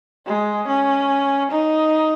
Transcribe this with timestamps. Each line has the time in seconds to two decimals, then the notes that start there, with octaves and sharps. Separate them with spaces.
0.26 G#3
0.68 C#4
1.51 D#4